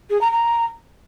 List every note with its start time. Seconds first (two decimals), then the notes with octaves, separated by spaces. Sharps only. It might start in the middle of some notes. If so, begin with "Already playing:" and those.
0.10 G#4
0.21 A#5
0.32 A#5